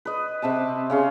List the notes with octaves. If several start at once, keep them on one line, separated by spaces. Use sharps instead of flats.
B4 D#5
C3 C4 B4 A5
C#3 C#4 C6